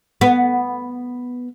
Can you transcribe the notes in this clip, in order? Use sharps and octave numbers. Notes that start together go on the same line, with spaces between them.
B3